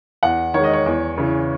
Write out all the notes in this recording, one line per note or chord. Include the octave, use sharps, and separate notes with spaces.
E2 F#5
D#3 G#3 C#5
D#5
C#5
E2
C#3 E3